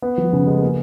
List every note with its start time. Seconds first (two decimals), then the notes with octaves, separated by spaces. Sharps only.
0.02 B3
0.18 F3
0.33 C#3
0.47 G#3
0.61 A#3